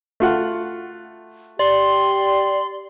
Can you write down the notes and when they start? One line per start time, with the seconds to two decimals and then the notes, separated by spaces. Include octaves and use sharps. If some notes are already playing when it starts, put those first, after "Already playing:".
0.20 A3 F4 F#5
1.59 G4 D5 C6